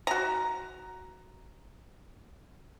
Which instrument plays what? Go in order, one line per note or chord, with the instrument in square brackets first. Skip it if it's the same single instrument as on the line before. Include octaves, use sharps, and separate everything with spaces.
[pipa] F#4 A#5